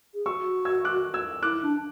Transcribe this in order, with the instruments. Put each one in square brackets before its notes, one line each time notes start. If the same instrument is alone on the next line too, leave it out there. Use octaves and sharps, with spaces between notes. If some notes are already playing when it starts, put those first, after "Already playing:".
[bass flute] G#4
[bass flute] F#4 [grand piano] C#6 E6
[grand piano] E6 G#6
D6 F#6
E6 G#6
[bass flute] E4 [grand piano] D6 F#6
[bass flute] D4